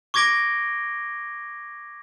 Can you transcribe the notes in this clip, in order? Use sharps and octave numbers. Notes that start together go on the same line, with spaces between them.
C#6 D6 G#6 A#6 D7 G7